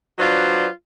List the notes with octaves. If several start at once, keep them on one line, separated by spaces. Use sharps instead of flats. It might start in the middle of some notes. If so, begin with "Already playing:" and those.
F#3 D4 F4 B4 C5 D5